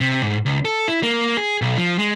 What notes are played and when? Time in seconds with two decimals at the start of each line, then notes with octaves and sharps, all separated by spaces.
0.01 C3
0.22 G#2
0.46 C#2
0.65 A4
0.88 E4
1.03 A#3
1.37 G#4
1.62 B1
1.78 F3
1.99 G#3